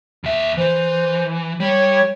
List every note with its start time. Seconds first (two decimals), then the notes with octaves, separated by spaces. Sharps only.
0.24 D#2 E5
0.57 E3 C5
1.60 G3 C#5